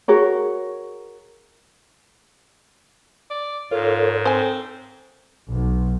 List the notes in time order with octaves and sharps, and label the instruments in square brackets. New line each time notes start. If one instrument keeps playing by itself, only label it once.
[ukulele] F#4 G#4 A#4 C#5
[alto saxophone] D5
[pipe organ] G#2 [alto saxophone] F4 [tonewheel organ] A4 A#4 C#5
[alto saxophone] C4 [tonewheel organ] A4 [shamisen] C5 G#5
[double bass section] B1